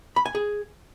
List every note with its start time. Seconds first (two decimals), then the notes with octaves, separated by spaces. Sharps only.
0.16 B5
0.26 G#5
0.35 G#4